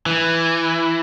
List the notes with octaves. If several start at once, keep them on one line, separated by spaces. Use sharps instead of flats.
E3